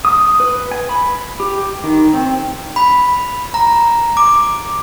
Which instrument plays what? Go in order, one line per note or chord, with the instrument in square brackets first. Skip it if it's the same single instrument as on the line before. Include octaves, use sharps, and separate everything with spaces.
[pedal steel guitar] D#6
B4
G#5
B5
G4
D#3
C4
[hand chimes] B5
A#5
D6